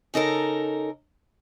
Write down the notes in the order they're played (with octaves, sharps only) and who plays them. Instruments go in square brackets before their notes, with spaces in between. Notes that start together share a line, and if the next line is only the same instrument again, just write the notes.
[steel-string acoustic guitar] C#3 D#4 A4 A#4